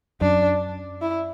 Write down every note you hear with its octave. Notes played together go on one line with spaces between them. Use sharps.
F#2 D4
E4